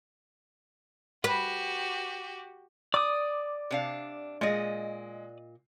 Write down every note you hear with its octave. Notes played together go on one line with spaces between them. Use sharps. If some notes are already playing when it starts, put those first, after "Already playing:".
F#4 G4 B4
D5 D6 D#6
C3 D4 F5
A#2 G#3 D#5